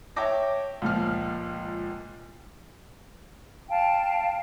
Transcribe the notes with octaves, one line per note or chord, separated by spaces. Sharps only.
C#5 E5 G5 A5 D6 A#6
C#2 A#2 F3 F6
F5 G5 A5